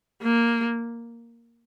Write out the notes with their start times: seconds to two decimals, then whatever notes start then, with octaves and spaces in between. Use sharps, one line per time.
0.22 A#3